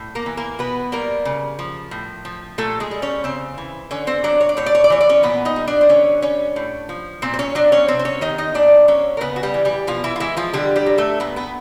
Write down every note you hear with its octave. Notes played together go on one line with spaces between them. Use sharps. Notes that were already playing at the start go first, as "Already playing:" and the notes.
Already playing: A2
A#3 A#4
E3
A#3 A#4
B2 B3 B4
G3 A#3 A#4
C#3
F3
A2
F3
A#2 A3 A4
G#3 G#4
G3
C#4 C#5
C#3 C4 C5
E3
D3 C#4 C#5
C4 C5
F#3 D4 D5
C#5
D5
A2 C#5
D5
C#5
D5
E3 C#5
D5
C#4 C#5
A#2 B3 B4
D#4 D#5
G3
D4 D5
C5
D3 C#4 C#5
G3 C#4 C#5
A2
F3
A#2 C4 C5
C5
C#4 C#5
F#3 D4 D5
C#4 C#5
C3 C4 C5
C5
C#4 C#5
D#3 D#4 D#5
D#4 D#5
A#2 D4 D5
F#3 C#4 C#5
A#4
C#3 B3 B4
F#4
G3 G4
E3
G3 G4
B2 F3 F4
E3 E4
F4
E3 G#3 E4
F3 F4
D3 G3 G4
G3 G4
F#3
A3 A4
A#2 B3 B4
B3 B4